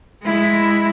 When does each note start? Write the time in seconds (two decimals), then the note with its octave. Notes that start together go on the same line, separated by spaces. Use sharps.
0.23 G#3 E4